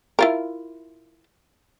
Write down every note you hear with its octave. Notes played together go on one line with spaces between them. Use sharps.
E4 F4 A#4